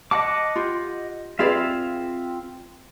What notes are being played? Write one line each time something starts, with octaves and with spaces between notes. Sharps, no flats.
D#5 F#5 A5 D6
F4 G4
C4 F4 G#4 B4 D5 E5